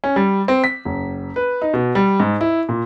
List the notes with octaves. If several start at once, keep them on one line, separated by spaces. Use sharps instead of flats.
C#4
G3
C4
B6
F#1
B4
D#4
B2
G3
G#2
E4
A#2